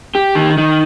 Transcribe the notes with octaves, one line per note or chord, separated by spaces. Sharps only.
G4
D#3
D#3